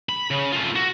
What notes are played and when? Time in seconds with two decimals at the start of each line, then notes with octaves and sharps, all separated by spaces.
0.09 B5
0.31 C#3
0.53 A3 F4
0.76 F#4